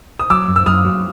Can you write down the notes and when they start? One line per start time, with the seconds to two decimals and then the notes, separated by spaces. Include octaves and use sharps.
0.19 D#6
0.30 F#3 D6 E6
0.48 F#2
0.56 E6
0.66 F#2 D#6 F6
0.85 F#3